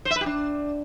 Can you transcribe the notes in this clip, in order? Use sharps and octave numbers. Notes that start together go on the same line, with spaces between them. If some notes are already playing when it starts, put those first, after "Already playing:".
C5
E5
B4
G4
D4